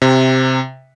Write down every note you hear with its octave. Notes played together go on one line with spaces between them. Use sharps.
C3